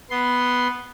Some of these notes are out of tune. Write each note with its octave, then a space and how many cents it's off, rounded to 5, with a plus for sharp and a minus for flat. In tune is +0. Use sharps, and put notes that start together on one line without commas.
B3 +0 C6 +0